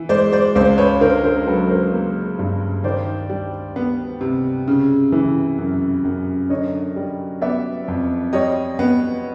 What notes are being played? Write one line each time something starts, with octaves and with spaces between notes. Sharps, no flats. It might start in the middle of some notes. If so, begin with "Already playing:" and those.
Already playing: E3
G#3 C5 D5
C5 D5
C#2 C5 D5
B4 C#5
D3 A#4 C5
A#4 C5
F#3 A4 B4
A#4 C5
A#3
G2
D#3 C5 D5
G3
B3
C3
C#3
E3
F#2
F#2
D3 C#5 D#5
G3
B3 D5 E5
F2
G3 C#5 D#5
B3